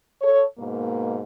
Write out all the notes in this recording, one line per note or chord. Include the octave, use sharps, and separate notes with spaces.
A4 C#5
G#2 B2 A#3